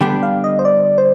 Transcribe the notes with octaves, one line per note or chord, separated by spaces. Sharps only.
D3 G3 B3 D4 G5
F5
D#5
C5
D5
C5